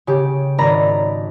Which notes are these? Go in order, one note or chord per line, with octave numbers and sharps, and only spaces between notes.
C#3 G4
G#1 D5 A#5 B5